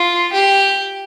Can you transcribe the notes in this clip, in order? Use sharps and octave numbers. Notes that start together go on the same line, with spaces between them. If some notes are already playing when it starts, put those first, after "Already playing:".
Already playing: F4
G4